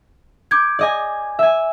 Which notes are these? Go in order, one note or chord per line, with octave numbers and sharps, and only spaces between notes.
D6 G6 G#6 D7
D5 D#5 G#5
E5 G#5